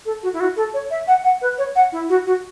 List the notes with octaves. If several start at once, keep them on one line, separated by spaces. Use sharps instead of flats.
A4
F#4
E4
F#4
A4
C#5
E5
F#5
F#5
B4
C#5
F#5
E4
F#4
F#4